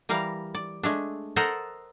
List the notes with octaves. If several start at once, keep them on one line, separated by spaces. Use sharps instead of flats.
E3 G3 A#4 F5
D5
G#3 A3 D4
A4 A#4 C5 D#5 F#5